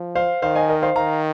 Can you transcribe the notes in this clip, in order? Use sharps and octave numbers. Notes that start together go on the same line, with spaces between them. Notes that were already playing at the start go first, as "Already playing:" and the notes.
Already playing: F3
C5 F5
D#3 C5 F5
D#5 G#5
A#4 D#5
C5 F5
D#3 F5 A#5